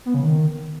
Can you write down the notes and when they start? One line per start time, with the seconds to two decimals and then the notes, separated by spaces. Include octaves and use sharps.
0.06 B3
0.14 C#3
0.23 D#3